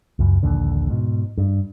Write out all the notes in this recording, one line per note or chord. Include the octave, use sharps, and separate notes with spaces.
C#2 F#2
D#1 A#1 D#2 D3
G#2 B2
G2